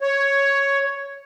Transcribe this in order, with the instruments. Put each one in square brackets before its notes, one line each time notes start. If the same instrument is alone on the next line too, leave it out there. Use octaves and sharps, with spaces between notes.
[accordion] C#5